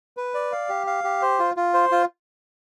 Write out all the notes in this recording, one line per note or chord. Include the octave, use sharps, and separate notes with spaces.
B4
D5
F5
G4
F5
G4
C5
F4
F4
C5
F4